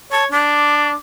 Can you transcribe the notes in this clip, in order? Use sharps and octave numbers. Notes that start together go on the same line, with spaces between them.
C#5 A5
D4 D6